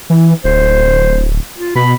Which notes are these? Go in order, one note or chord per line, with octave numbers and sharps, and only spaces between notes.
E3
D1 C5
F4
B2 B5